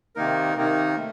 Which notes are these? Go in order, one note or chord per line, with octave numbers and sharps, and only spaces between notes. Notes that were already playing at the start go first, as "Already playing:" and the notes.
C3 D#3 A#3 D#4 A#4
C3 D#3 A#3 D#4 A#4
A3